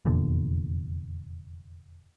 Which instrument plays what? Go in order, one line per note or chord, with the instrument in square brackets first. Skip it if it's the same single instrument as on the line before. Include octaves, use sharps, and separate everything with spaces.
[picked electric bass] F1 E2 A#2 D3